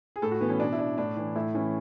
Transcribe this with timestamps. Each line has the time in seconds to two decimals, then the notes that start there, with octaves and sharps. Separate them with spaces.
0.16 G#4
0.22 A2 A4
0.31 F#4
0.41 E3 B3
0.50 C#4
0.60 B2 D4
0.72 E4
0.79 D4
0.98 A2 D4
1.17 E3
1.36 A2 E4
1.55 E3 C#4